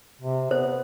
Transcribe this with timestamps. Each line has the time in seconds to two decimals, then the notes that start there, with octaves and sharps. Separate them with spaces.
0.21 C3
0.51 B3 C5